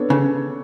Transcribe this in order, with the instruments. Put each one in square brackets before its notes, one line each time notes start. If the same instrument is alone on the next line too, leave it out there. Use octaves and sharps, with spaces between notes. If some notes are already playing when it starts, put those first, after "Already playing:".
Already playing: [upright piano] B3 D4 A4 C#5
[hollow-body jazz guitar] C#3